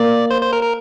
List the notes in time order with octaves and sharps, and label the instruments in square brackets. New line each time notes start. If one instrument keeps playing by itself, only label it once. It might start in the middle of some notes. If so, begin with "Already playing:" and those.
Already playing: [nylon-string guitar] A#3 [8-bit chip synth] D5
[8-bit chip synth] C5
C5
A#4
A#4